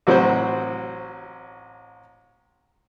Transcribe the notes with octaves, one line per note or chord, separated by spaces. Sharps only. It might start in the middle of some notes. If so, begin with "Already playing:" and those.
A1 F#3 C4 F#4 B4 C5